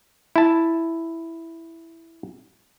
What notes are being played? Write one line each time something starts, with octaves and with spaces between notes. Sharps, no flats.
E4 A5